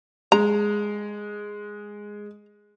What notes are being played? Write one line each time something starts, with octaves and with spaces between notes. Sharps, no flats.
G#3 A#5